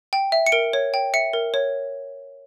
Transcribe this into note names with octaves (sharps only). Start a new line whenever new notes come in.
G5
E5
C#7
A#4 D7
C#5
G5
E5 C#7
A#4
C#5